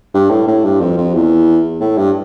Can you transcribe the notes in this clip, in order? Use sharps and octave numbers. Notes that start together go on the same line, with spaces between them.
G2
A2
A2
G2
F2
F2
E2
A2
G2